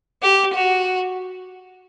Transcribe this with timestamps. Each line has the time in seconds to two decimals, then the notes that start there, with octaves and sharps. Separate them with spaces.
0.23 G4
0.54 F#4